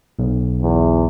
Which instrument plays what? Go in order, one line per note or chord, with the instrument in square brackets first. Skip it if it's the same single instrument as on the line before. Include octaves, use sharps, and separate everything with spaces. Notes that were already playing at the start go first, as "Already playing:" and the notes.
[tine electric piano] B1
[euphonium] E2